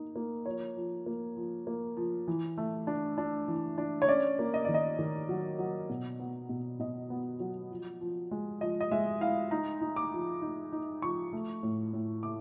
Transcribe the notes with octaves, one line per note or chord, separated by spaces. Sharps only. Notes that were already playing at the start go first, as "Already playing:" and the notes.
Already playing: A#3 D#4
A#3
F3 C#5
F3
A#3
F3
A#3
F3
E3
A3
D4
D4
E3
D4
C#5
C#4 D5
A#3
D#5
D#3 D5
D#5
D#3
F#3
F#3
B2
B3
B2
B2 D#5
B3
F#3
F3
F3
G#3
F3 D#5
D#5
G#3 E5
E4 F5
D#4 A#5
D#4
D6
F3
D#4
D#4
F3 C#6
A3
A2
A2
A3 D6